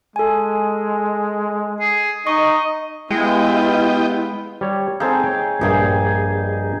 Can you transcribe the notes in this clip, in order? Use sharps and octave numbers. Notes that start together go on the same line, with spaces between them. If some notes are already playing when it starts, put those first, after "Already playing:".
G#3 A4 G#5
G#4
D#4 D#5 C#6
G#3 B3 E4 F4 G4 D#5 G5
G3 C#5
C4 D#4 G#4 A4 F5
C#5 G5
A#1 G2 D#4 G#4 G5